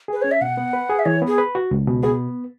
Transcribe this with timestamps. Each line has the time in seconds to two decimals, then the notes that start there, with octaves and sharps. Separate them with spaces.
0.08 G#4 B4
0.22 C#4 C#5
0.31 E5
0.41 B2 F#5
0.57 B3
0.73 B4
0.89 G#4
0.99 E5
1.06 E3 C#5
1.22 B3
1.27 G#4
1.38 B4
1.55 F#4
1.71 C#2
1.87 B2
2.03 B3 G#4